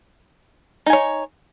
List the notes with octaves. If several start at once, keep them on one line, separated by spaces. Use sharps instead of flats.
D#4 C#5 G#5